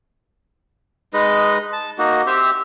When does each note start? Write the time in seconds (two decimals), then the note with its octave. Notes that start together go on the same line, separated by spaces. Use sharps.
1.13 G#3 D#4 B4 D#5
1.73 A5
1.98 A#3 D#4 F#4
2.27 C4 G4 C5 E5